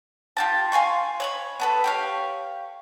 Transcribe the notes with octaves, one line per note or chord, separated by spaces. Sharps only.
F4 G4 A5
F5 G#5 C6 C#6
C#5 B5 C#6
B3 A4 B4
G4 C#5 F5